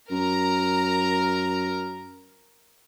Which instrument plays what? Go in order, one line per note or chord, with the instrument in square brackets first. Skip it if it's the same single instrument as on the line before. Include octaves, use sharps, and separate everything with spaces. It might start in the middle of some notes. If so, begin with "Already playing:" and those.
[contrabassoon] F#2 [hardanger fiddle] A#4 A#5